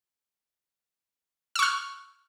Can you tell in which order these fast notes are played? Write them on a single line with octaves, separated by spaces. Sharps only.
E6 C#6 F6